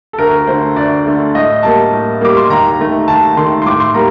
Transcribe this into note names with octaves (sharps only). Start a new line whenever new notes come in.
A4
D2 A#4
D3 A3 C5
D2 D5
D3 A3
A2 D#5
G3 A#3 A5
A2
G3 A#3 D6
C6
D#2 A#5
D#3 A3
D#2 A5
D#3 A3 C6
C6
A2 D6
C6
G3 A#3 A#5